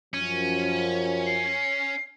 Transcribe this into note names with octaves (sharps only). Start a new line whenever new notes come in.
F#2 F3 C#4 D#7
C7